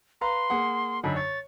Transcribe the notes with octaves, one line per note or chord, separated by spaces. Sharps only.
B4 F5 A#5 C6
A#3 G#4 F#5
F#2 D3 D#4 B5
C#5 A6